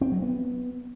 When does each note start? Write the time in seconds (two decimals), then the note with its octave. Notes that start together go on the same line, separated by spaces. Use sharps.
0.01 C4
0.12 F#3
0.22 B3